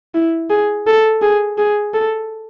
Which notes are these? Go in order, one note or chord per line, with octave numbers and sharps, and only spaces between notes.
E4
G#4
A4
G#4
G#4
A4